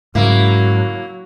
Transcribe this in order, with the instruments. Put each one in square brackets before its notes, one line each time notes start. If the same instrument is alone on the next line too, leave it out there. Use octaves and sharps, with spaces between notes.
[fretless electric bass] G#2 C#3 G#3 [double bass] F#3 [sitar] A#3 E4